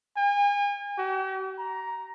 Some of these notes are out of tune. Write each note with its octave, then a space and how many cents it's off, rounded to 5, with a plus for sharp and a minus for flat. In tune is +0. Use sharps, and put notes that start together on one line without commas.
G#5 -40
G4 -45
A#5 +10